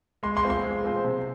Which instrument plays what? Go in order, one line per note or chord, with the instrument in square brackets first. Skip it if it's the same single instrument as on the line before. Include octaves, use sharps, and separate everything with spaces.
[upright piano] G#3 [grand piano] C6
[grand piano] C6
[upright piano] C4 F4 C5
[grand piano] C6
[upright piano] G#3
C4 F4 C5
C3